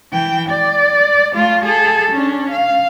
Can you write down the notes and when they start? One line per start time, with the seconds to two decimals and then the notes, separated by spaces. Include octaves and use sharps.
0.12 E3 G5
0.49 D5
1.34 A3 F4
1.65 G#4 A4
2.11 C#4 D4
2.51 F5